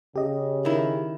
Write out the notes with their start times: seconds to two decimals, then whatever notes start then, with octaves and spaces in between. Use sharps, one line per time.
0.16 C#3 G4 D#5
0.65 D#3 E4